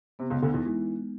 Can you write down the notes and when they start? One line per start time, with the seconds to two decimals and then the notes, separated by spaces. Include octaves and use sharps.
0.19 C3 B3
0.30 C#2 C#3
0.35 B3
0.42 D2 D3
0.50 E2 E3 D#4
0.65 E3 G#3